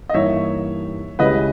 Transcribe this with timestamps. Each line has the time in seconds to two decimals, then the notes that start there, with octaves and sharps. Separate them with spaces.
0.09 D#5
0.14 G2 E3 A#3 D#4 C#5 E5
1.19 C#2 C#3 G3 C#4 E4 B4 D#5